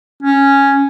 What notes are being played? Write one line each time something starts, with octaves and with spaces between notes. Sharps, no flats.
C#4